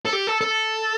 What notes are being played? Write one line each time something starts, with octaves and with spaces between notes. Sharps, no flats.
A4
G4
A4
A4